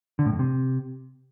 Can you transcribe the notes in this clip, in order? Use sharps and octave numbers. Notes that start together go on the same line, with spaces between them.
D3
A2
F2
C3